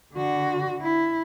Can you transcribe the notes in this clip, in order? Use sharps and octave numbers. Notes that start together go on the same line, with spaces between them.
D3 F#4
E4